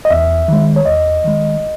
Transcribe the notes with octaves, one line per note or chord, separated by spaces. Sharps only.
D#5
E2 E5
D#3 G#3
C#5
E2 D#5
D#3 G#3